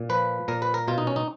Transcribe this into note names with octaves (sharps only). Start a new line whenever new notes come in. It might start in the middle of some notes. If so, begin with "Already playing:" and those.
Already playing: A#2
F3 B4
A#2 A#4
B4
A#4
B2 F4
D#4
C#4
D#4